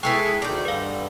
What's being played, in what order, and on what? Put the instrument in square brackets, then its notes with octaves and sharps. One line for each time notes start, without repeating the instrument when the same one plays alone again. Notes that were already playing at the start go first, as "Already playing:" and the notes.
[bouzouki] G#3 E4 B4 [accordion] G#4 A4 C#6 [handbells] G5
[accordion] D2 D#3 [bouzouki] D#4 D5 [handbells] G#4
[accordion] G2 D3 G3 [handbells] B4 F5